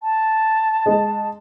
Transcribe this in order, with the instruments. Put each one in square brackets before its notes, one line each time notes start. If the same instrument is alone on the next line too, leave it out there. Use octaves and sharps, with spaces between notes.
[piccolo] A5
[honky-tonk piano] G#3